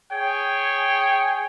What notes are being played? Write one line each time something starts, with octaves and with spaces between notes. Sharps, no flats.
G#4 C#5 G5 G#5